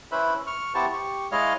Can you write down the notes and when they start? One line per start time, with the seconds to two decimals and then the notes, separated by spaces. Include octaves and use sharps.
0.12 C#4 E4 B4 C5 E5 B5
0.47 C#6 F6
0.75 B3 E4 G4 C5 A5 C#6
0.93 G4 C#6
1.32 G#3 E4 C#5 D#5 F5 F6